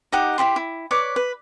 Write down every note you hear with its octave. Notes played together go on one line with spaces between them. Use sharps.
D#4 G4 F#5
E4 F#4 G4 C6
E4
B4 C#5 D5 D6
B4